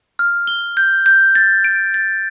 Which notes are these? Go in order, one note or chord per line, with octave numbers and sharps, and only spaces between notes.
F6
G7
G6
G6
A6
D7
A6